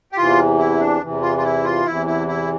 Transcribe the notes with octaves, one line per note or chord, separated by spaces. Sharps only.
G4
E2 C3 E3 F4
E4
D4
E2 C3 E3
F4
F4
E4
F4
E2 C3 E3 E4
E4
E4